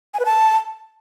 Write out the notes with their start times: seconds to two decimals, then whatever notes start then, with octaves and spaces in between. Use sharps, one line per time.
0.14 G#5
0.20 B4
0.25 A5